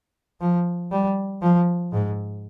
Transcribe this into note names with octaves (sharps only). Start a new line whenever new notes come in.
F3
G3
F3
G#2